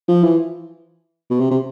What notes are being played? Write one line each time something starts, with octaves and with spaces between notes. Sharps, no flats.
F3
E3
B2
C3
C3